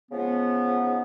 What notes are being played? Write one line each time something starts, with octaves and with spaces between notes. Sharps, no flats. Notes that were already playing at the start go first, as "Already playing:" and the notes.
C#3 F3 G#3 B3
D#4